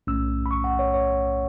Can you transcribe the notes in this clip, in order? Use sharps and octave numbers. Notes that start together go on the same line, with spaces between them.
B1 A2 A3 C#4 E6
B5
C#6
F#5
C#5
C#5